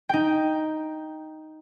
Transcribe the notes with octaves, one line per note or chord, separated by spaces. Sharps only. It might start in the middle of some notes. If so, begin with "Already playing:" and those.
D#4 G5